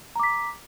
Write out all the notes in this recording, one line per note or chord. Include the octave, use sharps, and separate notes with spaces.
A#5 D6 B6